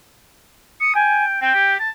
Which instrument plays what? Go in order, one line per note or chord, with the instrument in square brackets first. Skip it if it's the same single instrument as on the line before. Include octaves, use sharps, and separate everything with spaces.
[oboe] D#6 [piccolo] C#7
[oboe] G5 [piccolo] G#5
[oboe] C4 [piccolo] G5
[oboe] G4
A5